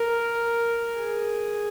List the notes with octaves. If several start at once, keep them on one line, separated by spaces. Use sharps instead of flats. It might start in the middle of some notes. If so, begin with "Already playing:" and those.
Already playing: A#4
G#4